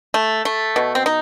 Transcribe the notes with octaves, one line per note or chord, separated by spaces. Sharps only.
A3
A3
B2
C4
D#4